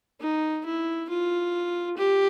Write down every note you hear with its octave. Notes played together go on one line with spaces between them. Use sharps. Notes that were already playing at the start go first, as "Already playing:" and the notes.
D#4
E4
F4
G4